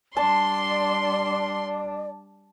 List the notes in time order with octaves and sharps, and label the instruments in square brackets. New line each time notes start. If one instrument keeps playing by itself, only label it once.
[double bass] G3 D4 [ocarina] D5 [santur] A5 [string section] C6